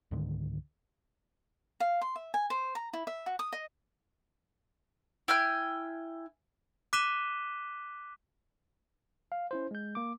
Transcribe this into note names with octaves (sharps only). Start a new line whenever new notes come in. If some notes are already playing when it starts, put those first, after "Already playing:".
C#2 G#2 D3 D#3
F5
C6
E5
G#5
C5
A#5
E4
E5
F#4
D#6
D#5
E4 G5 G#5 F6
D6 F#6 B6 D#7 E7 G7
F5
C#4 E4 C5
G#3 G6
A#3 D6